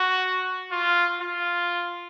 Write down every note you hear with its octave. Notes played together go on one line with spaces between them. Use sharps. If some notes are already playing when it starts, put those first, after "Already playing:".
Already playing: F#4
F4
F4